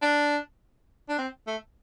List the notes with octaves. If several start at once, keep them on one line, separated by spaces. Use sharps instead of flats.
D4
D4
C4
A3